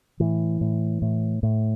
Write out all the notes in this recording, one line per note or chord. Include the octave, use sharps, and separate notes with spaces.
A2 E3
A2
A2
A2